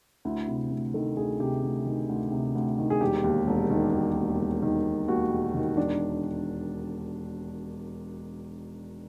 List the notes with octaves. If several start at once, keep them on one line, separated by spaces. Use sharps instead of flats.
D2 E4
C3
D2
D#3 A4
D2 G#4
C3 G4
D2
D#3
D2
C3
D2
D#3
G#4
E1 G4
D#2
E1
D#3
E1
D#2
E1
D#3
E1
D#2 F#4
E1
D#3
E1 D4